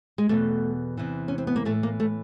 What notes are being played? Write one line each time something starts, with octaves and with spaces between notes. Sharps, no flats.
G#3
E2 B2 A3
E2 C3 E3
C#4
C4
B3
A#3
A2 E3 A3
A#3
A3